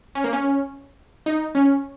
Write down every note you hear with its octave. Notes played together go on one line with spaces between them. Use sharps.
C#4
A#3
C#4
D#4
C#4